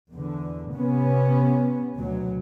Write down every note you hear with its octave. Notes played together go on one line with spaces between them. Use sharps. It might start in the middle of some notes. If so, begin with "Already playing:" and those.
E2 D3
C3 B3 C#4
D2 B2 F#3